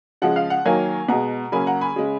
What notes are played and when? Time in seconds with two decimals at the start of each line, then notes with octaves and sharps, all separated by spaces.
0.22 C#3 F3 G#3 F#5
0.36 F5
0.50 F#5
0.65 D#3 F#3 A#3 F5 G#5
1.09 B2 G#3 F#5 A#5
1.52 C#3 F#3 A#3 G#5 B5
1.67 F#5 A#5
1.81 G#5 B5
1.96 C#3 G#3